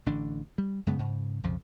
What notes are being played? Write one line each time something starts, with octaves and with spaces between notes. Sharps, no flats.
A1 D3 D4
G3
F#2 C#3 G#3 B3
G#2 C#3
B1 F2 C#3 F3